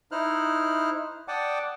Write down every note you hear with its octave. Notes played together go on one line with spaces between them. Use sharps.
D#4 E4 C5 F6 F#6
D5 F#5 G5 A5 D6 D#6